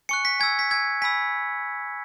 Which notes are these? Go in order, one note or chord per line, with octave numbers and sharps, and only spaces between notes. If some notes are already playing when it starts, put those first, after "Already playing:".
G#5 C#6 F#6 C#7
B6
G#5 E6 G#6
B6
G#5 E6 G#6
G#5 B5 E6 B6